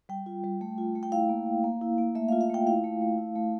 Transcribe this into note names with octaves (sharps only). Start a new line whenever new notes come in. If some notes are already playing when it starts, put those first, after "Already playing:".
G3 G5
F4
G3
A3
F4
A3
G5
E4 F5
A#3
A#3
A#3
E4
A#3
A3 E5
F5
F4
F5
A3 G5
E4 F5
A3
A3
E4
A3